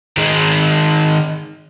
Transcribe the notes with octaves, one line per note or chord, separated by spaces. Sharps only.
D#3 G#3